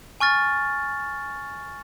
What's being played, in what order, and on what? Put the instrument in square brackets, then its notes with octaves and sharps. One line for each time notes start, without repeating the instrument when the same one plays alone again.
[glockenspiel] G#5 C#6 F6 A6